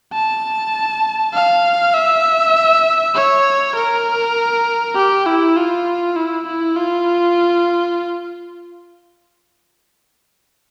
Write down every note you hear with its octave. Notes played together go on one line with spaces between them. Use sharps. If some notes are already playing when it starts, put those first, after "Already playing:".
A5
F5
E5
C#5
A#4
G4
E4
F4
E4
E4
F4